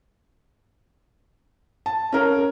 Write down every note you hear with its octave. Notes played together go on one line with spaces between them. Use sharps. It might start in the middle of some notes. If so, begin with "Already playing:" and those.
A5
C#4 A#4